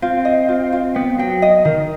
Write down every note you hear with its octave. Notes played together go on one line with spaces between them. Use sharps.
C4 F4
D#5
F4
F4
B3 G5
F#3 G5
D#5
D#3 A#4